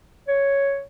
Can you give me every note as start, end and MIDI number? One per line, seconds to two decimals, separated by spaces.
0.28 0.82 73